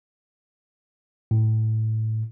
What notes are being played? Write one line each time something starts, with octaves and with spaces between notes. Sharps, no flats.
A2